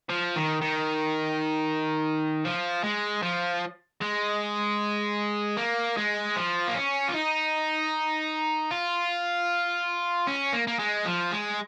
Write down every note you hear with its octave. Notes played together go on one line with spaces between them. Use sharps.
F3
D#3
D#3
F3
G#3
F3
G#3
A#3
G#3
F3
A#3
C#4
F4
D#4
F4
C#4
A#3
A#3
G#3
F3
G#3